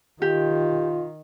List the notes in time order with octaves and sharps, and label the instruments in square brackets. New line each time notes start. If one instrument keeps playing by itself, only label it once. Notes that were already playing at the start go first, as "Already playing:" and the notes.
[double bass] D#3 [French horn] F4 [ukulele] G4